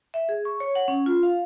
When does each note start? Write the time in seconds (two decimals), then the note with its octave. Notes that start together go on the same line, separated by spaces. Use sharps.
0.14 E5
0.29 G#4
0.45 C#6
0.60 C#5
0.75 F#5
0.88 C#4
1.06 F4
1.23 F5